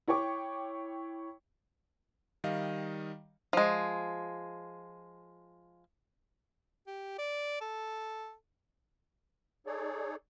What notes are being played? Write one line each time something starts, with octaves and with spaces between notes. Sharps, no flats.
E4 C#5 G5 C#6 D6
D#3 G3 D#5 F5
F3 G#3
G4
D5
A4
D#4 G#4 A4 C#5 D5